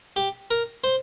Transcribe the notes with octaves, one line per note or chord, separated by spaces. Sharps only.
G4
A#4
C5